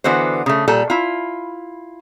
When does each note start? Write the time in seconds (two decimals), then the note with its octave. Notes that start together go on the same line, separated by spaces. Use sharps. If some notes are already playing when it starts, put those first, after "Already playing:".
0.04 D3 E3 B3 F#4 C5
0.46 C#3 A3
0.68 A#2 G3 A4
0.90 E4 F4